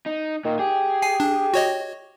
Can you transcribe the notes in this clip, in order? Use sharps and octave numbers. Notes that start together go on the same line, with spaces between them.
D#4
A#2 D#3
G4 G#4
G#5 C7
D4
F#4 C#5 D#5